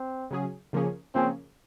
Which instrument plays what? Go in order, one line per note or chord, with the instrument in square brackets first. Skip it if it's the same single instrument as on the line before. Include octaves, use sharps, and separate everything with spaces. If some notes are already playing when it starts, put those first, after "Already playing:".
Already playing: [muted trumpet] C4
[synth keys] C#3 F#3 C#4 G#4
C#3 F3 A#3 C#4 G#4
[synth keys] C#3 F3 A#3 C#4 G#4 [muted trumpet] C4